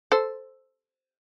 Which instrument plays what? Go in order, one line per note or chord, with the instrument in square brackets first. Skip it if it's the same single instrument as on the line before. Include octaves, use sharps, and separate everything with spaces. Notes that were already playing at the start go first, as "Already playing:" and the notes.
[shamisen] A4 C5